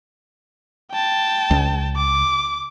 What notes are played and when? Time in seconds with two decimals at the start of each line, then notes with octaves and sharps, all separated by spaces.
0.92 G5 A5
1.51 C#2
1.96 D6